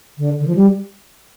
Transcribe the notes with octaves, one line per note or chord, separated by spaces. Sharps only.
D3
D3
F3
G3